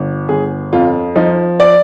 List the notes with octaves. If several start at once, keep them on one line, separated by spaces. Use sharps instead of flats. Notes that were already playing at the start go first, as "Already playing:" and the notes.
Already playing: G1
G1 G#4
F2 F4
F3 D#4
D5